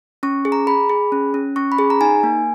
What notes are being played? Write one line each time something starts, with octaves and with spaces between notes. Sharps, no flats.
C#4 C#6
G#4
A#5
G#4 B5
G#4
C#4
C#4
C#4 C#6
B5
G#4
A#5
D#4 G#5
A#3